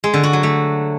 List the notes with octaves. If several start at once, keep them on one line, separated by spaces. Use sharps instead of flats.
G#3
D3
F#4
F#3
A3